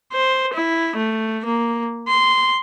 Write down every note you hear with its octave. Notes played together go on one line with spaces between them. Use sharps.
C5
E4
A3
A#3
C6